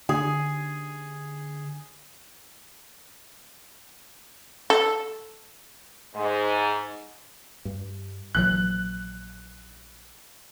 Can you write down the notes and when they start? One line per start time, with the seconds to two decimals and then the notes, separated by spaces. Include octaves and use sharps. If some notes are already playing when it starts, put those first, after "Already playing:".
0.09 D3 G#4
4.70 A4
6.16 G#2
7.65 G2
8.35 A#1 E3 F#3 F#6